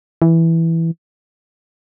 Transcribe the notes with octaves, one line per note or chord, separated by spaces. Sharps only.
E3